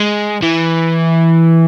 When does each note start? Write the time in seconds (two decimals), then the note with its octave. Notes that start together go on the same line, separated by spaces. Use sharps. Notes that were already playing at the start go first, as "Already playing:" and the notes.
Already playing: G#3
0.43 E3